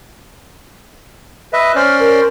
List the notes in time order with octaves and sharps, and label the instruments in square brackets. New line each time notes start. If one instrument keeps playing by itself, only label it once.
[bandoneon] B4 D#5 E5
[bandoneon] C#4 C5 D5 [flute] F6
[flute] A#4